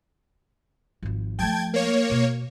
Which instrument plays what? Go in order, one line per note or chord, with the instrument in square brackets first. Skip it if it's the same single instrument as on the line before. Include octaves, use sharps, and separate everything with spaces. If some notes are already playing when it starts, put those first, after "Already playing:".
[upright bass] G#1 F3
[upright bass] F3 A3 [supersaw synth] G5 A5 G#6
[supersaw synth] A#3 C#5
[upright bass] B2